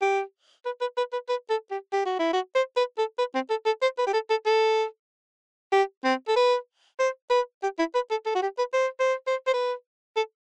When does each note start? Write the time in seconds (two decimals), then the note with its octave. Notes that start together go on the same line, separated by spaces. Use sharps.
0.02 G4
0.65 B4
0.81 B4
0.97 B4
1.13 B4
1.29 B4
1.49 A4
1.71 G4
1.93 G4
2.06 F#4
2.19 E4
2.33 F#4
2.55 C5
2.76 B4
2.98 A4
3.18 B4
3.35 C4
3.50 A4
3.66 A4
3.82 C5
3.98 B4
4.07 G4
4.13 A4
4.30 A4
4.46 A4
5.72 G4
6.04 C4
6.28 A4
6.36 B4
6.99 C5
7.30 B4
7.63 G4
7.79 E4
7.94 B4
8.10 A4
8.26 A4
8.35 F#4
8.42 G4
8.58 B4
8.73 C5
9.00 C5
9.27 C5
9.47 C5
9.53 B4
10.16 A4